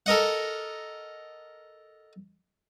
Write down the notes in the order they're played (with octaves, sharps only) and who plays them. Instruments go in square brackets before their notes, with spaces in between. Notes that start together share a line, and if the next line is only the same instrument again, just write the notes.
[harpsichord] A4 A#4 D#5 F#5